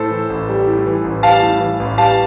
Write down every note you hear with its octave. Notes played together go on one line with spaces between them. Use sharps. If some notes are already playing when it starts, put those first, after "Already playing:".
Already playing: A2 A4 C5
E3
A1
G3
A2
E3
A1
G3 F5 A5
A2
E3
A1
G3 F5 A5